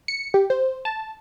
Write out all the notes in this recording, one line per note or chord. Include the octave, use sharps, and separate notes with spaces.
C#7
G4
C5
A5